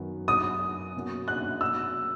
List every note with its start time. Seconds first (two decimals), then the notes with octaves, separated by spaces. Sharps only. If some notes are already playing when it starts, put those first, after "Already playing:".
Already playing: F#2 D#3 F#3 B3
0.28 D#6
0.95 B2 A#3 C#4 F#4
1.28 F#6
1.61 E6